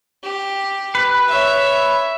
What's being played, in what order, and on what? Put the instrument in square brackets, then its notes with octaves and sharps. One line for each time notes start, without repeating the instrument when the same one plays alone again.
[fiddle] G4
[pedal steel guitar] B4
[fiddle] C#5 E5